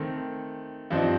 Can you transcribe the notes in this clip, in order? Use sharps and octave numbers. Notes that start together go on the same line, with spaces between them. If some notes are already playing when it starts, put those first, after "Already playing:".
Already playing: D#3 A3 C4
G2 F3 C4 D#4